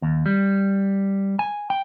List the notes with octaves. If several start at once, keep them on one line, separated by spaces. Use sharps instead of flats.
D#2
G3
G#5
G5